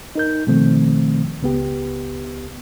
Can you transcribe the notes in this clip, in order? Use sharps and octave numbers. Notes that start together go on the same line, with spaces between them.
D#4 A#4 G6
B2 D#3 F3 A3 C4
C#2 B3 G4